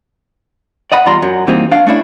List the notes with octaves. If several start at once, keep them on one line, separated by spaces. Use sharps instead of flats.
D5 D#5 F#5 B5
E2 G3 F4 D5 A#5 C6
F#2 F#3
E3 G3 A#3 C4 D#4
D4 F5
A3 C#4 D4 E4